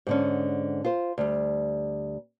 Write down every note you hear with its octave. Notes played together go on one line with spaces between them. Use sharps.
G#2 D3 C#4
F4 C5
D2 G3